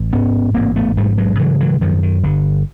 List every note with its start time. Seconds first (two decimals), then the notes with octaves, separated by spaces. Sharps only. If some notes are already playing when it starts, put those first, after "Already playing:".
Already playing: A1
0.13 G#2 B3 C#4
0.55 A1 A#3 C4
0.76 A3 B3
0.97 G#2 G3 A3
1.18 F#3 G#3
1.39 C#3 E3 F#3
1.60 E3 F#3
1.81 F#2 D#3 F3
2.03 D#3
2.23 G1 D3